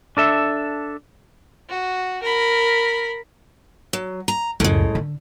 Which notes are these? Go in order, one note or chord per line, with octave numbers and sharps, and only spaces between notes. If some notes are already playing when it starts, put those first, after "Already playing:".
D4 A4 E5
F#4
A#4 B5
F#3
A#5
C#2 F#2 A2 G#3
D3